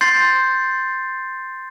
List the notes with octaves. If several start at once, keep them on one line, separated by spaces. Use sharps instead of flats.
C6 G6 A6 C7